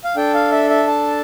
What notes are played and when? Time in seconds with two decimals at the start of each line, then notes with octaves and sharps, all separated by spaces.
0.04 F5
0.16 D4 A4 G5
0.34 F5
0.52 E5
0.70 E5
0.87 A5